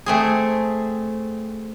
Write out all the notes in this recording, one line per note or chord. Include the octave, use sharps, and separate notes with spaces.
A3 C4 G#4